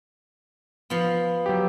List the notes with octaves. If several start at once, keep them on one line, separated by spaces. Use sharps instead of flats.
F3 B3
F#3 G4